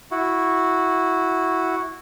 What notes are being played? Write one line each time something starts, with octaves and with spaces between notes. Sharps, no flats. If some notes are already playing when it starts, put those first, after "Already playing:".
E4 F#4